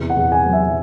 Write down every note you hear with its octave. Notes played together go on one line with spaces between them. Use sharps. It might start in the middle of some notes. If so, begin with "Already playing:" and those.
Already playing: E2 C3
F#5
E2
G#5
F#3
E5